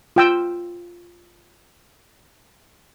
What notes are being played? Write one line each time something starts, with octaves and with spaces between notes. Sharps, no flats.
F4 G5 E6